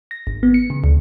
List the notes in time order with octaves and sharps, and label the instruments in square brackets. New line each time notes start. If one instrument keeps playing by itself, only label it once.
[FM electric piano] A#6
G#1
B3
C#7
C#3
D2